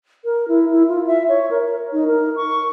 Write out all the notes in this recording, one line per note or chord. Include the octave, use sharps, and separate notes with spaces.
A#4
E4
E4
F4
E5
C#5
A#4
D#4
A#4
C#6